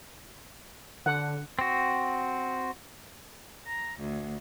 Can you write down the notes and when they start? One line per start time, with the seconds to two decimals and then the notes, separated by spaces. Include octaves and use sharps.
1.06 D3 F#5
1.59 C4 F#4
3.66 A#5
4.00 D2